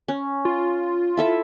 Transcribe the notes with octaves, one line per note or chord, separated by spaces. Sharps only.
C#4
F4
E4 A4 E5